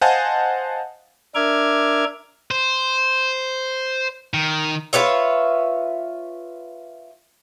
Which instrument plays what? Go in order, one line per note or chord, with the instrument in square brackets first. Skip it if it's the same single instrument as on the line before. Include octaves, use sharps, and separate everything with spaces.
[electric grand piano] C5 D#5 F5 F#5 G#5 A5
[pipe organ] D4 A#4 E5 D6 F6 G#6
[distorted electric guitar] C5
D#3
[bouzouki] F4 B4 C#5 E5